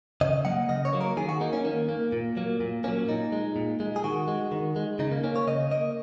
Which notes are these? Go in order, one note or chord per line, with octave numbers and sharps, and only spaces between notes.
C#3 D#5
F#3 A#3 F#5
C#3 D#5
C#5
F#3 A#3
A#4
D#3 G#4
F#4
A#3 D#4
C#4
D#3 A#3
A#3
A#2
F#3 A#3
A#2
F#3 A#3 C#4
A#2 D#4
G#3
A#2
G#3
G#4
D#3 F#4
G#3
D#3
G#3
C#3 D#4
A#3
A#3 C#4
C#5
C#3 D#5
A#3 D#5